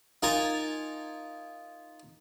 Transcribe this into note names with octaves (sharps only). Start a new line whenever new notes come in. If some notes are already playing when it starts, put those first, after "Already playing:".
D#4 F4 A#4 G#5 A5